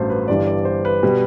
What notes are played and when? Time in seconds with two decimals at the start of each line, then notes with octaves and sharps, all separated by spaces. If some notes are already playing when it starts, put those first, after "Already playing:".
Already playing: A1 G2 F#3 A3 C5 A5
0.10 B4
0.28 G1 G2 E3 G3 D5
0.47 D5
0.65 C5
0.85 B4
1.03 B2 G3